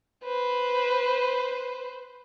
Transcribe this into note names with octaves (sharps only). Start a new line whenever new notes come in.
B4 C5